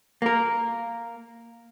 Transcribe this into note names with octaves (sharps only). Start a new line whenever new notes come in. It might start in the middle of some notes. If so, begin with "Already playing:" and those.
A#3 A#4